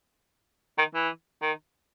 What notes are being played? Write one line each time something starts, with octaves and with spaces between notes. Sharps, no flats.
D#3
E3
D#3